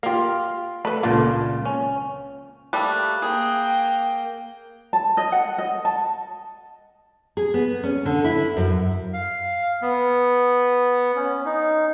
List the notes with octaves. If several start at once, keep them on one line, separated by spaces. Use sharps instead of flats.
A#3 F4 G4 F5
A3 B4 B5
C#2 A#2 A#3 D4 F4 A4
C#4
G3 A3 A#3 F#6
A#3 G#4 G5
A5
D#5
F#5
D#5
A5
G#4
B3
C#4
D3
E4
F#2
F5
B3
C#4
D#4